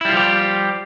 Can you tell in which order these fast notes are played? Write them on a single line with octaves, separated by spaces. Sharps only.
E4 G3 F4 F3 G4